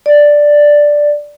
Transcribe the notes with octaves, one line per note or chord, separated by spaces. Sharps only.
D5